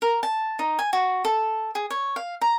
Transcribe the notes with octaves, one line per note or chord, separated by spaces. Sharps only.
A#4
A5
D#4
G#5
F#4
A4
G#4
C#5
F5
A#5